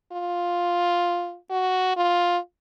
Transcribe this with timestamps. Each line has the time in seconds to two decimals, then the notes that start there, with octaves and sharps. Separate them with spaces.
0.12 F4
1.50 F#4
1.97 F4